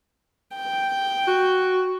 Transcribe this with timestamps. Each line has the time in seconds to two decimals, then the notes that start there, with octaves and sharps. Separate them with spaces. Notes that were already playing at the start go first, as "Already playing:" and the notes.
0.56 G5
1.28 F#4